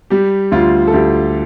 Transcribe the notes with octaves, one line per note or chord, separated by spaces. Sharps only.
G3 G4
D2 F4
A4
D2 G4